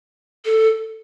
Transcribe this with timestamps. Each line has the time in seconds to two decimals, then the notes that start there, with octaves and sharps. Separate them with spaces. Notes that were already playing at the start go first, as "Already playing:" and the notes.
0.45 A4